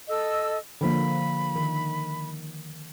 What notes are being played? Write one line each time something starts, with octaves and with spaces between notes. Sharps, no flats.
A4 D#5 E6
D3 F3 A#3 B5
D#3